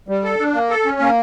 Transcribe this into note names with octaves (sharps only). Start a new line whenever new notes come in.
G3
A4
D4
A#3
A4
C#4
A#3